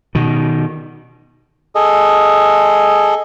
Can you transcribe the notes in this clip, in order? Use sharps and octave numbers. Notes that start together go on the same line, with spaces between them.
B2 D#3
G#4 A4 D#5